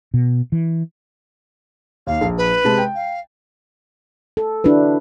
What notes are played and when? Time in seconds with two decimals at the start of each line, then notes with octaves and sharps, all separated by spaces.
0.14 B2
0.52 E3
2.07 D#2 F5
2.21 A#1
2.37 B4
2.64 C3 G#3 A5
2.78 G5
2.95 F5
4.37 A4
4.64 D4 E4 F#4 B4